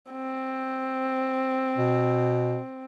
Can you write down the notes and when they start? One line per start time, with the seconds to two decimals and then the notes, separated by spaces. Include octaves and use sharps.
0.11 C4
1.78 B2